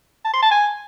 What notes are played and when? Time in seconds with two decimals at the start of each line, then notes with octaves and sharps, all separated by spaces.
0.25 A5
0.33 C6
0.42 A5
0.51 G#5